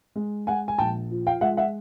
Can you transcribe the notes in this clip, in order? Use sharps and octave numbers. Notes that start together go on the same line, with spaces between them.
G#3
G#3 F#5 G#5
G#5
A#1 G5 A5
F3
F5 G5
G#3 E5 F#5
E5 F#5